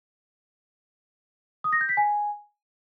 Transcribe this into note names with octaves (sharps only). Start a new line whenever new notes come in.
D#6
A#6
G6
B6
G#5